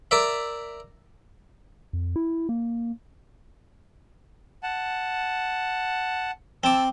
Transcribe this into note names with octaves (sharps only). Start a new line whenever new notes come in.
A#4 D5 E5
F2
E4
A#3
F#5 A5
C4 A5 D6 E6